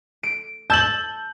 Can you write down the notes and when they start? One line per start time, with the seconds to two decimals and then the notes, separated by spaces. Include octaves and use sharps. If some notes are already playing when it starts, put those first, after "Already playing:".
0.23 D7
0.70 A5 E6 G6 A6 F#7